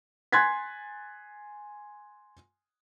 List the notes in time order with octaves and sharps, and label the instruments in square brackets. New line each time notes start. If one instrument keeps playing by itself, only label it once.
[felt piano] G#5 C6 F#6 G#6 A6 B6